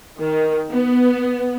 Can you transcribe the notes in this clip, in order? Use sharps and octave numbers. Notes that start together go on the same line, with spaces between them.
D#3
B3